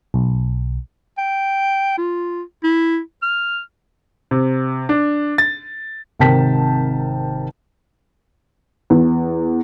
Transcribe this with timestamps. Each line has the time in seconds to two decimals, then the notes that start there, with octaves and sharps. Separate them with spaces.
0.14 B1
1.18 G5
1.98 F4
2.64 E4
3.23 F6
4.31 C3
4.89 D4
5.38 A6
6.19 G#1 C3 A#4 G5 A5 B6
8.90 E2